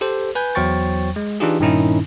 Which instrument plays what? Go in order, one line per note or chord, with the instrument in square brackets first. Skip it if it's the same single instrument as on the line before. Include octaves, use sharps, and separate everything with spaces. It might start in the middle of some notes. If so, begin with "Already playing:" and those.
[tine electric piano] G4 A4 C5
B4 G#5 G6
E2 F#3 C5 G5 C#6 A6
G#3
E3 D4 D#4 F4 G4 G#4
G2 A#2 D#3 C#4 D#4 E4